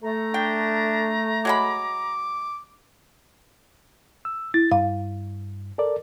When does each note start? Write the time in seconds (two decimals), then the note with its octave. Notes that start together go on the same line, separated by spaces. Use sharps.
0.03 A3 A#5
0.34 D4 G5
1.45 F#3 G#3 B5 D6
4.25 E6
4.54 E4 A6
4.72 G2 F5
5.78 A4 A#4 D5